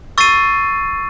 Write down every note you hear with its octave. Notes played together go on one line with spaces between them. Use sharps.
C#6 E6 A6 C7 D#7